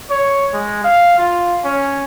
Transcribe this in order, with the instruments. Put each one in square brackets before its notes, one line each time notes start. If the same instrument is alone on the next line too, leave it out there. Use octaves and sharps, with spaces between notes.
[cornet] C#5
G#3
F5
F4
C#4